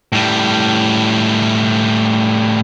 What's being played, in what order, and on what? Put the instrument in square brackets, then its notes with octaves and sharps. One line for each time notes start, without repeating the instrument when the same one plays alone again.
[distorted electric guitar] A2 G3